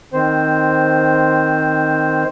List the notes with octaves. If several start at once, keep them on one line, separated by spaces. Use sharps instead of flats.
D#3 C4 C5